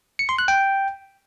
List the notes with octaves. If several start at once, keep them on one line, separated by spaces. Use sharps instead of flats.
C#7
C6
F#6
G5